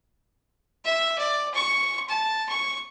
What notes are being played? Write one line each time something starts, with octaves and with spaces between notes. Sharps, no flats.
E5
D5
C#6
A5
C#6